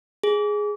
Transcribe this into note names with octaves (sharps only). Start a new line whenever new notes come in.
G#4